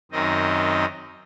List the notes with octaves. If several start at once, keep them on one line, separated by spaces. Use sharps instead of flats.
F#2 D#3 C4 D#5